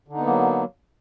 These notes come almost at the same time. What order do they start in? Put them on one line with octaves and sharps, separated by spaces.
D3 D#4 B3 A#3 F#3